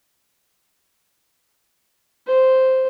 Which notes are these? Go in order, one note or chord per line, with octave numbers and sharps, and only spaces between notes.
C5